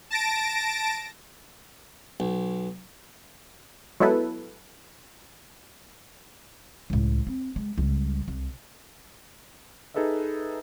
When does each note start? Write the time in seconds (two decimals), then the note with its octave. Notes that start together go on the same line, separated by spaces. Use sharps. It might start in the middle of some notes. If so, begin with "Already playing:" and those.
0.10 A5 A#6 D7
2.20 B1
4.00 F#3 G#3 B3 E4 A4 B4
6.90 C#2 A2
7.27 C4
7.56 G#3
7.78 C#2 G3
8.28 C2
9.94 D#4 G#4 A4 B4 D#5 E5